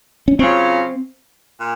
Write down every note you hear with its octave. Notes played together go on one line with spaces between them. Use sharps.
C#4
C#3 F#3 C4 C#4 F4
A#2